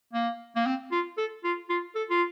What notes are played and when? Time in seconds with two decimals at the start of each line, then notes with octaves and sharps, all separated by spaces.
0.13 A#3
0.56 A#3
0.66 C4
0.92 F4
1.17 A4
1.44 F4
1.70 F4
1.95 A4
2.10 F4